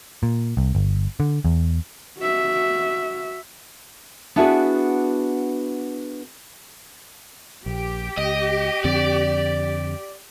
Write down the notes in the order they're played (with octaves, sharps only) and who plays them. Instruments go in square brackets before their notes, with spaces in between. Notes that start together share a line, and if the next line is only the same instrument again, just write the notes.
[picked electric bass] A#2
C2
G1
D3
E2
[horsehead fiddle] F#4 E5
[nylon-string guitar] B3 D4 E4 F#4 G#4 B4
[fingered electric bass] A#1 [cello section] G4
[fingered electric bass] C#2 [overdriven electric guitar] D#5
[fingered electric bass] F2 D3 C4 [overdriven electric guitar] D5